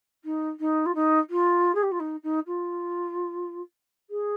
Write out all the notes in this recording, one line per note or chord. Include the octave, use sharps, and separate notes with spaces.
D#4
D#4
F4
D#4
F4
G#4
G4
F4
D#4
D#4
F4
G#4